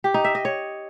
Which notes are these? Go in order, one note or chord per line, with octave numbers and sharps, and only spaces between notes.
G4
D#4
E5
D#5
C#5